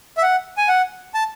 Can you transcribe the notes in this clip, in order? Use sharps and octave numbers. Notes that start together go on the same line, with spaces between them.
E5
F#5
G#5
F#5
A5